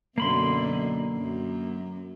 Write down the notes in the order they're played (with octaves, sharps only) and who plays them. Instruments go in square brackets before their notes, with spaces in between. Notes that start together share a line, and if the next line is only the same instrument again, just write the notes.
[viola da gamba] F#2 B2 D3 [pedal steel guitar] A#3 B5 C6
[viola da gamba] F#2